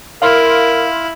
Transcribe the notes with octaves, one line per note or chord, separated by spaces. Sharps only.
E4 A#4 F5 C6 F6